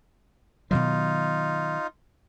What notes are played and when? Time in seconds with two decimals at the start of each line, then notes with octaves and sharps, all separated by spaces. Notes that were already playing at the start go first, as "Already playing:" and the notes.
0.71 B2 D#3 F#3 D#4 F4